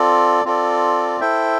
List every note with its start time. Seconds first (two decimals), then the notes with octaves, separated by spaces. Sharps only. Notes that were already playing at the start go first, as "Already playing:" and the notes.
Already playing: C4 F4 A4 D5
0.45 C4 F4 A4 D5
1.21 E4 A4 C5 E5 G5